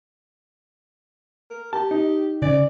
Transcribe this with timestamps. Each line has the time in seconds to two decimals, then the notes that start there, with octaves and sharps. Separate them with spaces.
1.51 A#4
1.73 G4 A5
1.91 D#4
2.42 C#3 D5